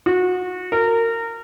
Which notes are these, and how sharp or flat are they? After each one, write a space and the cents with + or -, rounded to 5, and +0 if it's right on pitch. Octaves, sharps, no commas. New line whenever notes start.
F#4 -25
A#4 -25